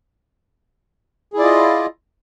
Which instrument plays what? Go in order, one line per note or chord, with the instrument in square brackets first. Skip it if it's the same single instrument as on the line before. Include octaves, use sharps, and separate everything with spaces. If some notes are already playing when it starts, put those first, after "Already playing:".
[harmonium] G#4
E4
D5
F4
D#5